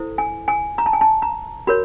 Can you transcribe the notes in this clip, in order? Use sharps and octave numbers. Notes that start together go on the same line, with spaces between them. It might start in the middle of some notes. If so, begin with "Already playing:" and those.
Already playing: E4 A4 C5
G#5
G#5
A#5
A5
G#5
A5
A#5
F#4 A#4 C#5 B5